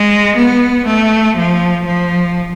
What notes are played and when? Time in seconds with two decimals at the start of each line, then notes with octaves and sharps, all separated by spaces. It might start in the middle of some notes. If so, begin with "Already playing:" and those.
Already playing: G#3
0.36 B3
0.87 A3
1.36 F3
1.86 F3